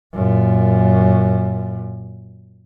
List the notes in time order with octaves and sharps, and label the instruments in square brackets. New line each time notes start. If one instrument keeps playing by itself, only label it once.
[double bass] F#2 A#2